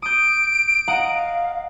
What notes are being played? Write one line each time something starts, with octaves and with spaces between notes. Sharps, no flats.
D#6 G6 D7
D#5 F5 F#5 A#5